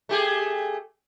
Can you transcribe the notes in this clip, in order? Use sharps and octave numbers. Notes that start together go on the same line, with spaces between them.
A3 G4 G#4